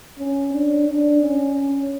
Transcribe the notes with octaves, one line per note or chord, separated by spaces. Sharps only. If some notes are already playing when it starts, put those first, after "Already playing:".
C#4
D4
D4
C#4